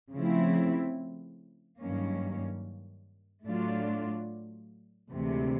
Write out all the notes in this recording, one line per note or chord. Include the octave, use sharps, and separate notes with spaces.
C#3 F3 A3 C4 E4
G2 D#3 F#3 A#3 C#4
A2 F#3 A3 D4 F4
D2 C3 E3 G#3